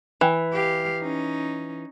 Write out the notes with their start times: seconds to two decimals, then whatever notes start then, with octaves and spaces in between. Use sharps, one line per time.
0.21 E3
0.53 G4 F5
1.02 C#4 D#4